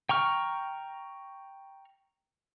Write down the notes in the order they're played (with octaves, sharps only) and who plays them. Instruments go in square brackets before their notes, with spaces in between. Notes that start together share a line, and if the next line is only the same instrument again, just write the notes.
[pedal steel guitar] G5 A#5 C#6 F6